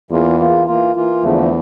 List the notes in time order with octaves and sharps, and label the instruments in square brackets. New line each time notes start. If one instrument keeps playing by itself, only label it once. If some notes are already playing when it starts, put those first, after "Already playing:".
[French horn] E2 [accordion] E3 A#3 F4
[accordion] E3 A#3 F4
E3 A#3 F4
E3 A#3 F4
[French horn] E2 [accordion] D3 F3 A3